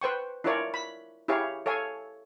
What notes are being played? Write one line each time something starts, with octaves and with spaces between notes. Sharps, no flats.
B4 C5 G5 C#6
D4 E4 F4 A#4 C#5 D5
B5
E4 G4 G#4 C#5 F5
A4 C#5 F5 G#5